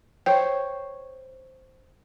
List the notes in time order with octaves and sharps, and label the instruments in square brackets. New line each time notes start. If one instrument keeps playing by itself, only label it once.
[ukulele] C5 C#5 [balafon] G5